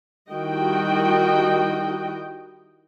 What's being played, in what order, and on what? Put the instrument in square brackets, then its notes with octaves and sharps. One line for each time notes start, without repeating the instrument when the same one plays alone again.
[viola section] D#3 G3 E4 F#4 D#5 G5